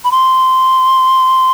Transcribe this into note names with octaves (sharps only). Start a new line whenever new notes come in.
B5
C6